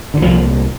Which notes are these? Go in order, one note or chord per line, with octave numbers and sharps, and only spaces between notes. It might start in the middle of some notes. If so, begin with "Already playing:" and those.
D3
C2 A#2 F3